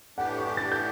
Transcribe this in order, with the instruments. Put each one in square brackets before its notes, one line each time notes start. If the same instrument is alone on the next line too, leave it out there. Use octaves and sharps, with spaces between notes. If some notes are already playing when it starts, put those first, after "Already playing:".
[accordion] A2 E3 B3 D4 G4 [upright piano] F#5
[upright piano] C#6
D6
A6
G6